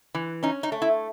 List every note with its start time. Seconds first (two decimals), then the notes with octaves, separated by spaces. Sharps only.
0.15 E3
0.43 C#4 D#4
0.63 D#4
0.72 A3
0.82 E4